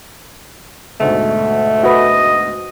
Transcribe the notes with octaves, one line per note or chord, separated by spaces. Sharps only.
D2 G#2 B2 A3
F#4 B4 D#5